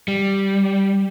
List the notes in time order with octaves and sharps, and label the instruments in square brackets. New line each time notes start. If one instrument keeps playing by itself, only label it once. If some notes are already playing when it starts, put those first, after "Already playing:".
[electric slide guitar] G3